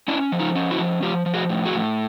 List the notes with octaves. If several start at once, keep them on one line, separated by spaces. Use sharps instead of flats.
C#4 D4 E4
F3
D#4 F4
C#4
E4 F#4
F3
F3 F4 G4
F3
F#4 G#4
A2
F#4 G#4
A2